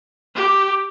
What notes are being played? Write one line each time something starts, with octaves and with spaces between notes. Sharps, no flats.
G4